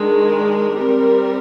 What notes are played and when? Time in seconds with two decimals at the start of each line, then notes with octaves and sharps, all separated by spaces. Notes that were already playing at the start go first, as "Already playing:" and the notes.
Already playing: D#3 G#3 D4
0.27 A#4
0.72 G3 C4